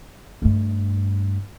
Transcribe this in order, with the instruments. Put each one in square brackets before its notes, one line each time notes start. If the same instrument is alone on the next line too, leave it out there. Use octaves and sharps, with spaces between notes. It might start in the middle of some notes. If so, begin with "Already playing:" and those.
[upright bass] G2 A3